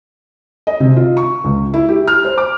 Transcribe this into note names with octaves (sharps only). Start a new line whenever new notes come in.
D#5
C3
F4
C#6
C#2
E4
G4
F6
C5
D6